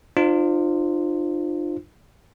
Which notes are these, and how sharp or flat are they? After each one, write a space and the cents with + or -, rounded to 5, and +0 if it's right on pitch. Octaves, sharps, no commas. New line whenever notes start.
D4 +45 F4 +0 C5 +0